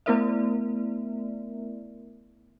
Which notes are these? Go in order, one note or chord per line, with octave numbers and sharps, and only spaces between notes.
A3 B3 E4 A#4 D5 E5